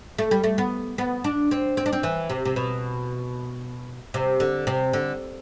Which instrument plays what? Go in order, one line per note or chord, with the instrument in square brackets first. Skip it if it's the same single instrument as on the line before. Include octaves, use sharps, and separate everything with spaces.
[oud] A3
G3
A3
B3
B3
D4
C4
C4
D4
C4
E3
C3
C3
B2
C3
D3
C3
D3